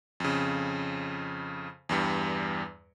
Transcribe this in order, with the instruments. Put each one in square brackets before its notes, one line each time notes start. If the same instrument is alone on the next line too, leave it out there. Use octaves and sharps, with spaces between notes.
[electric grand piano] F2 C#3
E2 G2 G3